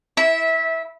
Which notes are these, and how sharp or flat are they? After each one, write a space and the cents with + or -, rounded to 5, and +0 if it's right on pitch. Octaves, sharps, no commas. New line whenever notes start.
E4 -10 E5 -20